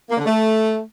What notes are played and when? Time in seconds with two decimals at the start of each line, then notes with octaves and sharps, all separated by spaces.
0.10 A#3
0.17 D3
0.25 A3